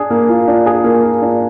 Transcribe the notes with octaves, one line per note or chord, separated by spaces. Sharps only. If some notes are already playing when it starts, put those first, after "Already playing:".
Already playing: D4 G#4
A#3
F4
D4
G#4
A#3
F4
D4